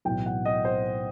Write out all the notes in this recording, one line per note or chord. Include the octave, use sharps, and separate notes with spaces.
B1 A2 E3 G5
F#5
D#5
C5